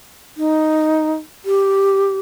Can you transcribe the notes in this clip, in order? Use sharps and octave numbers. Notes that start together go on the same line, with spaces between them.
D#4
G4